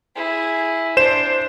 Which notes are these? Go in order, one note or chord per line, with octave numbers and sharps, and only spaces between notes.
E4 G#4
D4 C5 E7